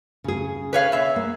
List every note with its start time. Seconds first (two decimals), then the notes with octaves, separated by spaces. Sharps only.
0.24 C#3 G#4
0.73 B4 C#5 F5
0.92 B2 E5
1.16 A#3